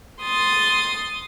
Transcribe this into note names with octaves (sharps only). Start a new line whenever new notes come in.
C6 D#6 A6